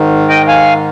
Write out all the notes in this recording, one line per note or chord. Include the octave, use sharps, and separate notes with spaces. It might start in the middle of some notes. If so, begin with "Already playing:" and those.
Already playing: G#2 D#3
D#5 G5
F5 G#5